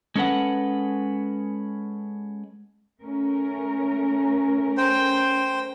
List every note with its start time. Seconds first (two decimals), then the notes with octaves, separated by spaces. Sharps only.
0.15 G#3 C#4 A4 B4 F#5
3.03 A3 C#4 A#4
4.77 C5 G5